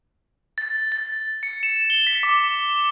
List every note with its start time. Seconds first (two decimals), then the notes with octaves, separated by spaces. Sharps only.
0.58 A6
0.92 A6
1.43 C#7
1.63 E7
1.90 G7
2.07 B6
2.23 D6